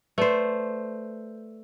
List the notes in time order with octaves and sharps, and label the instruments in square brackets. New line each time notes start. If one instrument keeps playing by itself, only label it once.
[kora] A3 C5 [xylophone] B4 D5 C6